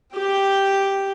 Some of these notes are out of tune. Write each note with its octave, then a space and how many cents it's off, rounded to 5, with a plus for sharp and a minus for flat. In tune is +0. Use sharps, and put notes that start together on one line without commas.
G4 +0 G5 +0